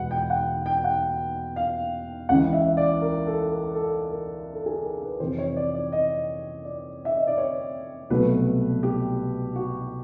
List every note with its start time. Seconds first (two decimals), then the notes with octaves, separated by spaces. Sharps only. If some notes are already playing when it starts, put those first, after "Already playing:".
Already playing: E2 B2 G#3 B3 F#5
0.11 G5
0.30 F#5
0.66 G5
0.84 F#5
1.56 F5
2.29 C#2 C#3 E3 F#5
2.53 E5
2.77 D5
3.02 A#4
3.27 A4
3.51 A#4
3.75 A4
4.11 A#4
4.54 A4
4.66 G#4
4.83 A#4
5.01 B4
5.20 F2 C3 E3 C5
5.38 C#5
5.56 D5
5.74 D5
5.92 D#5
6.65 D5
7.05 E5
7.16 D#5
7.27 D5
7.38 C#5
8.10 C2 B2 F#3 A3 B4
8.83 G4
9.56 F#4